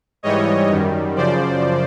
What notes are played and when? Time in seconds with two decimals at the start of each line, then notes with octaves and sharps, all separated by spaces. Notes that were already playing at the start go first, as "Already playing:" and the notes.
0.23 G#2 E3 G3 C#5 D#5
0.69 F#2 D#3 G3
1.15 F#2 C#3 F3 C5 D5